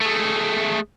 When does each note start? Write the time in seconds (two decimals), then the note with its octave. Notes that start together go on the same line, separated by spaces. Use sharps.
0.01 G#3 A3